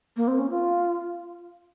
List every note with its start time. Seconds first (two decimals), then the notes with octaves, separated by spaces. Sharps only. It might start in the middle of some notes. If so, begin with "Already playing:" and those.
0.17 A#3
0.28 C4
0.38 C#4
0.50 F4